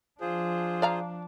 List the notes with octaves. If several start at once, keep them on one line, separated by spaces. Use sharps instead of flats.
F3 D4 F4 G#4 C5
D5 F5 A#5